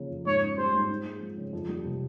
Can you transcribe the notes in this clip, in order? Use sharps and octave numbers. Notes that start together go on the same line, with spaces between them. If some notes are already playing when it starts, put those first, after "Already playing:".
Already playing: C#3 F3 A#3
F2
G#2 C#5
C#4
G3 C5
G#2
C4
G#3
F3
C#3
F2
G3
C3